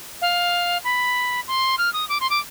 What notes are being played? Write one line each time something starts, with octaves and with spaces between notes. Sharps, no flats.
F5
B5
C6
F6
D#6
D6
C6
D6